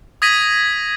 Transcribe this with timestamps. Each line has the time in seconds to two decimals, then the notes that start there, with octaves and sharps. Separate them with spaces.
0.22 D#6 G#6 A#6 B6 D#7 F#7